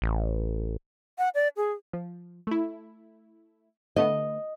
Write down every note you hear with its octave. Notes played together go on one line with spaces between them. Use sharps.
A1
F#5
D5
G#4
F3
A3 E4
D3 A3 B3 D#5